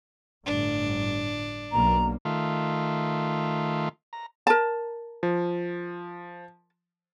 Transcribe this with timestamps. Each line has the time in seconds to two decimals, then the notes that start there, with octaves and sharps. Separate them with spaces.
0.46 G1 A2 D4
1.72 B1 A#3 A#5
2.25 D#3 A3 F4
4.13 A#5
4.47 A#4 A5
5.23 F3